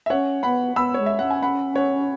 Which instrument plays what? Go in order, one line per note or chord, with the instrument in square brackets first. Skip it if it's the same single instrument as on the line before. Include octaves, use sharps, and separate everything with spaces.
[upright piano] E5
[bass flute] C#4 [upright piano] C#5 F#5
[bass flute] B3 [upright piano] F#5 B5
[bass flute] B3 [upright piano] B5 E6
[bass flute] G#3 [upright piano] C#5
[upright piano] E5
[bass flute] C#4 [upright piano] F#5
[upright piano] G#5
F#5 B5
C#5 F#5